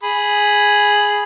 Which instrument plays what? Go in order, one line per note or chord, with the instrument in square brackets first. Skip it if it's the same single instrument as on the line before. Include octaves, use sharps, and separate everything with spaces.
[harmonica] G#4 B5